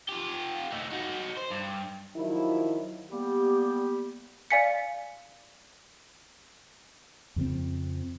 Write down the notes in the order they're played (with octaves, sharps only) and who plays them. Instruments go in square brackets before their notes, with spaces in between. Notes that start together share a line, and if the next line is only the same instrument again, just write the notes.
[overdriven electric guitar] F4 G4
A3 D#4
D#4 F#4
C5
G2
[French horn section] D#3 F3 F#3 E4
[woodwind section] G3 A#3 B3 G4
[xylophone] D5 F5 G#5 B6 C#7
[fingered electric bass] F2 C#3 F3 C4